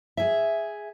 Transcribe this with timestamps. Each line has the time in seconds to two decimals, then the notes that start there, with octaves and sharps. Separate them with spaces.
0.17 G#4 E5